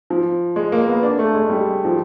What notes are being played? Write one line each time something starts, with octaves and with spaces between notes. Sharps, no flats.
F3
G#3
A#3
B3
D4
A3
G#3
G3
F3